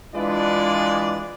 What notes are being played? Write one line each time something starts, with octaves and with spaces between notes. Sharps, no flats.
E3 G#3 D4 F4 B4 D5